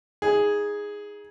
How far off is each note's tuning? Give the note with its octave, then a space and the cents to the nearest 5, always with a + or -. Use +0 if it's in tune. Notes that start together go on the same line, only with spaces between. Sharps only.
D#4 +25 G#4 -5